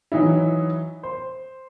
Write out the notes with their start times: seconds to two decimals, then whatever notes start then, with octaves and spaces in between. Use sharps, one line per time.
0.12 E3 F#3 D#4 E4
1.03 C5